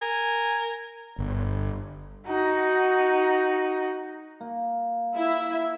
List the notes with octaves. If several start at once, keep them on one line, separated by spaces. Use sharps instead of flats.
A#4 G#5
G1
D#4 F#4
A#3
E4 E5